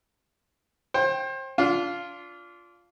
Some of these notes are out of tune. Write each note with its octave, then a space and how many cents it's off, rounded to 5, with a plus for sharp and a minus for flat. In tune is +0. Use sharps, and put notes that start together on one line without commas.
C5 +30 G5 +0
D4 -25 F4 +0